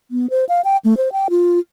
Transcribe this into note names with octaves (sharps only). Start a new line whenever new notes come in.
B3
C5
F5
G5
A3
C5
G5
F4